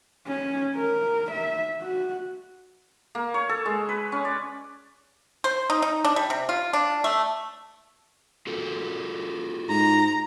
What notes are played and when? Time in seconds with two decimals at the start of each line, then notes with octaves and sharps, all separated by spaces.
0.27 C#4
0.75 A#4
1.32 E5
1.82 F#4
3.15 A#3
3.34 C#5
3.49 A4
3.66 G#3
3.89 B4
4.12 C#4
4.25 D5
5.44 C5
5.70 D#4
5.82 D#4
6.05 D4
6.16 G3
6.30 C3
6.49 F4
6.73 D4
7.04 A3
8.47 F4 F#4 A4
9.69 G#2 A#5